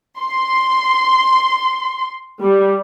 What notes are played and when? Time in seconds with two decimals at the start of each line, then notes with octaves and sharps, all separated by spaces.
0.21 C6
2.41 G3